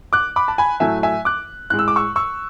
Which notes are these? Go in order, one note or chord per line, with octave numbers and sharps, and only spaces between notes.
D6 F#6
B5 D6
A5
G#5 B5
A2 F#3 A3 E5 G#5
E5 G#5
D6 F#6
A2 G#3 F#6
E6
D6
C#6 E6
C#6 E6